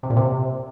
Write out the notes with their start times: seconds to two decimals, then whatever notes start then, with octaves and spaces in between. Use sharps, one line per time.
0.03 C3
0.10 A#2
0.17 C3